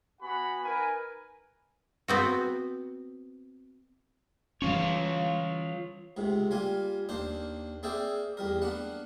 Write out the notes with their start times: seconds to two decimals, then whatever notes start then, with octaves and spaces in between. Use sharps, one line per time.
0.21 B3 F#4 F#5 G#5 B5
0.64 D#4 A#4 B4 G#5
2.08 B3 C4 F#4
4.62 E3 G3 C#4 F4 C#5
6.17 C#2 G#2 C3
6.51 G3 A#3 F4 G#5
7.09 D#2 A#3 D4 C5
7.83 A#3 C4 G#4 D5 E5 G5
8.37 E2 G3 A#4
8.62 A#3 B3 D4 F#5